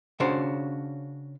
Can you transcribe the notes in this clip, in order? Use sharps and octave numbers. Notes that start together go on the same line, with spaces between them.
C#3 C#4 D4 F#4 C5